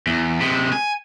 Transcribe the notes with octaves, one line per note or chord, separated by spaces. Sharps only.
E2
C3 G#3
G#5